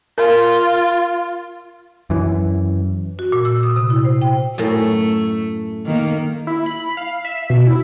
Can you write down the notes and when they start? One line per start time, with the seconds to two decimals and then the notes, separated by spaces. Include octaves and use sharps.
0.18 F4 A#4
2.10 F#2 E3
3.19 F#4
3.32 A#2
3.45 E6
3.63 D#6
3.76 C3
3.90 E4
4.05 C5
4.22 G5
4.58 F#2 A2 A3
5.86 D#3 A#3
6.47 E4
6.66 B5
6.97 F5
7.25 E5
7.50 B2
7.67 E4